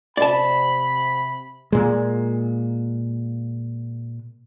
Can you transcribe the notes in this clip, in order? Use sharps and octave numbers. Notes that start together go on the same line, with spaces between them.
C3 D5 A5 B5
A#2 G#3